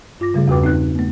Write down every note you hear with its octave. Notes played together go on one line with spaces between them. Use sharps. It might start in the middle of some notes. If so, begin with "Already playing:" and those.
G2 F4 D6 A#6
C#3 G3 A3 G#4
E2 G2 F#4 B4 G5 D6
C4 D#4 F#6
A3 B3